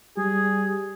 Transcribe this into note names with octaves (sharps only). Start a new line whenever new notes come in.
G3 G#4